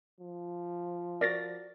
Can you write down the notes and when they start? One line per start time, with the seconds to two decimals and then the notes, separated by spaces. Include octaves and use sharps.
0.20 F3
1.21 F#4 A#4 D5 A6 A#6